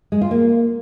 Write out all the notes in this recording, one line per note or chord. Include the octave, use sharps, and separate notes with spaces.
G#3
F4
A#3